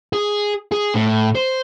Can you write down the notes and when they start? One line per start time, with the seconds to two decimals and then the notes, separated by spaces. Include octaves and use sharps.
0.13 G#4
0.72 G#4
0.95 A2
1.35 C5